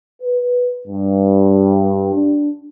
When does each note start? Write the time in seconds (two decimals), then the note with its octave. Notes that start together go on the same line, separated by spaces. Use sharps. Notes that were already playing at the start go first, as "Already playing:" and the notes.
0.22 B4
0.87 G2
2.14 D4